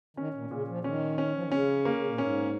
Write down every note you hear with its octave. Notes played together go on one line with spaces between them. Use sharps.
D#3 C#4
A#2
A#2 C#3
F3
D#3 C#4
C#4
F3
D#3
C#3 C#4
A#3
C#3
A#2
G#2 C#4